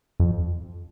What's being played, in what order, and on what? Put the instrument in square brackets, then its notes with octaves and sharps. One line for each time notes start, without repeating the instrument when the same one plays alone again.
[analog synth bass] F2